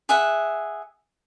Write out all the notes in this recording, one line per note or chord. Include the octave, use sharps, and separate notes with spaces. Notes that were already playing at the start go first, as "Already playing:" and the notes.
G#4 E5 F#5